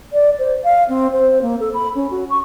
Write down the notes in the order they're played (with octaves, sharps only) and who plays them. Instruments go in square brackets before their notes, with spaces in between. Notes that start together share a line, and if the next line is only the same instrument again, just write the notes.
[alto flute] D5
C5
F5
C4
C5
A#3
A4
B5
C#4
F#4
C#6